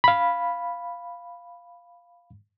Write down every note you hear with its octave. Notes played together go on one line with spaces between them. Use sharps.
F5 B5